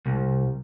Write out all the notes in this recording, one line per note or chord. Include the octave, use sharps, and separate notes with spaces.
C2